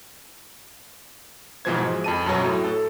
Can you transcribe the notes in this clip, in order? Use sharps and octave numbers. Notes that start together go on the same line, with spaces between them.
G#2 B2 E3 F3 C5 G#6
G#3
F2 A5 D#7
F#2 B2 F#3
A2
A4